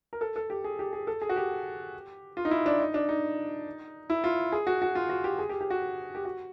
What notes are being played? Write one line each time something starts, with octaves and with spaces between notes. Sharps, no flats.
A#4
A4
A4
G4
G#4
G4
G#4
A4
G#4
F#4
G4
F4
D#4
E4
D4
D#4
D4
D#4
E4
F4
G#4
F#4
F#4
F4
F#4
G4
G#4
G4
G4
F#4
G4
F#4